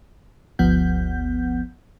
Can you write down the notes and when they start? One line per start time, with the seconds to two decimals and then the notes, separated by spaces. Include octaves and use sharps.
0.59 G1 D2 F3 B3 F#5 G6